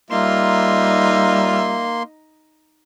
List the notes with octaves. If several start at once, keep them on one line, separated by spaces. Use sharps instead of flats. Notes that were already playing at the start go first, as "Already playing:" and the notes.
G3 A#3 D#4 F4 E5 C6